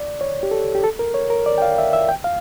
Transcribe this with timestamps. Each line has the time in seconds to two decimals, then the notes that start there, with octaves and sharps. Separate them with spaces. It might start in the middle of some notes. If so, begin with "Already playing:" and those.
Already playing: D5
0.21 C#5
0.43 G4
0.51 A4
0.75 G4
0.84 A4
0.99 A#4
1.14 C#5
1.30 A#4
1.46 D5
1.58 G5
1.62 F5
1.78 E5
1.93 E5
2.09 G5
2.24 F5